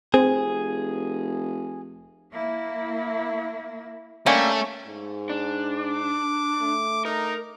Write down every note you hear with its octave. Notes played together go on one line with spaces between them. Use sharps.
F1 C4 G#4
A#3 E4
G3 A3 A#3 C#4
G#2
D4
D6
A3
D#4 A#4